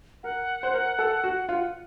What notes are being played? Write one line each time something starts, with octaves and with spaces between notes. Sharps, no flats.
A#4 F#5
C5
A#4
A4
F#4
F4